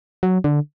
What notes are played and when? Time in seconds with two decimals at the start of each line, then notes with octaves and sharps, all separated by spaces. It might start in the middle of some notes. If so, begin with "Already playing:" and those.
0.23 F#3
0.44 D3